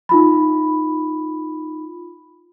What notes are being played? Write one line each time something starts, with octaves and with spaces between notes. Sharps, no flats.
D#4 F4 B5